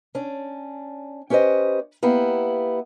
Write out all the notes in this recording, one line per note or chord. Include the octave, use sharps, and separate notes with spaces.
C#4 D4
C#4 G4 B4 C5 D#5
A#3 B3 E4 G4